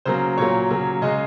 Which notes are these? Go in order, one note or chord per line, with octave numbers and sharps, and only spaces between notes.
C#3 F#3 A#3 C5
A#2 F#3 A#3 C#5
C#3 F#3 A#3
C#3 G#3 D#5